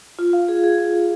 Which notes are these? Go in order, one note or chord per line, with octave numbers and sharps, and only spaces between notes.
F4
F5
G#4
G#4
G#4
G#4